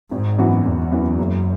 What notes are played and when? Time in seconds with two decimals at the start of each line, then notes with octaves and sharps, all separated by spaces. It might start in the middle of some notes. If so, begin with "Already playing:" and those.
0.11 G#1 G#2
0.38 F#2 E3 B3 F#4
0.65 G#1 E2
0.92 F#2 E3 B3 F#4
1.18 F#1 F#2